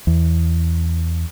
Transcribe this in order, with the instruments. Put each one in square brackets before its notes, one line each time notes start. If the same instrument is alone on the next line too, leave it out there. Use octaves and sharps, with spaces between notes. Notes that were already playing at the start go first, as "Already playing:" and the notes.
[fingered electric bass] E2